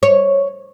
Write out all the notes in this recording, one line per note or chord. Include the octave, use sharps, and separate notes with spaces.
C#5